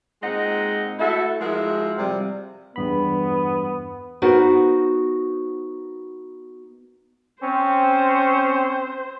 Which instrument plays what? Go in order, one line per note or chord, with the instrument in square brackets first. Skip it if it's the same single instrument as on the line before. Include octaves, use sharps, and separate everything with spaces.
[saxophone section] A#2 G#3 C4 D#4 D#5 F#5
A3 E4 F#4 A4 E5
F3 G#3 E4 F#4 G#4 A#4
C3 F3 G3
[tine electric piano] E2 G2 B5 [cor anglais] B3
[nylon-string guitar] B3 D#4 F#4 A#4 C5
[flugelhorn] C4 [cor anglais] C#4 [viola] C5